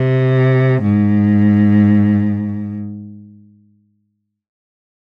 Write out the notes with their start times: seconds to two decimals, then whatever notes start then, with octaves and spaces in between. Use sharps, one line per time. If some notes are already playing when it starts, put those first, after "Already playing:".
Already playing: C3
0.82 G#2